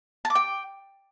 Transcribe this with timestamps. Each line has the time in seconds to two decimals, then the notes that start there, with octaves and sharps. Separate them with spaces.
0.25 A5
0.30 D6
0.35 G5